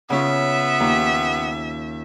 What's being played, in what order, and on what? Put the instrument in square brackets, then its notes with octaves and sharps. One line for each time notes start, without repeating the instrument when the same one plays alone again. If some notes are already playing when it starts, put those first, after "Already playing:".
[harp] C#3 C#4 F4 [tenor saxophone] B3 [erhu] E5
[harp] D#2